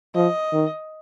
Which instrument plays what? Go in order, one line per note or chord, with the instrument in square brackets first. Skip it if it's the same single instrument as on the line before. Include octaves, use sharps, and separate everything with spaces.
[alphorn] F3 [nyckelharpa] D#5
[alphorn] D#3